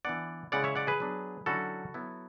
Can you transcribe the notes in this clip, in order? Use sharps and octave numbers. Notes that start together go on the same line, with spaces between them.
E3 B3 D4 D5 F#5
C#3 G#3 C#4 E4 D5 F#5
C#5 E5
D5 F#5
G#4 B4
F#3 B3 D4
D3 F#3 C#4 E4 F#4 A4
F#3 B3 E4